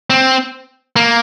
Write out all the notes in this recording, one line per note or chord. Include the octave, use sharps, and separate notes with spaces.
C4
A#3